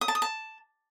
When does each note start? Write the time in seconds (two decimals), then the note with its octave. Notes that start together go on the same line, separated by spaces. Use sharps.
0.01 D#6
0.08 A5
0.15 D#6
0.22 A5